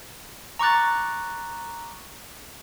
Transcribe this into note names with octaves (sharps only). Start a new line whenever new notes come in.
A#5 C#6 D6 F#6 A6